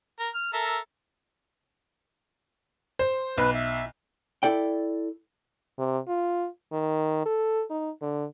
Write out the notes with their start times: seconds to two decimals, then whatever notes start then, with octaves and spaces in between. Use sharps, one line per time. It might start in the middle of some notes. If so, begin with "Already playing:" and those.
0.19 A#4
0.34 F6
0.53 A4 A#4 E5
2.99 C5
3.38 B1 B4
3.54 E5
4.43 E4 A4 D5 G5
5.78 C3
6.08 F4
6.72 D#3
7.26 A4
7.70 D#4
8.02 D3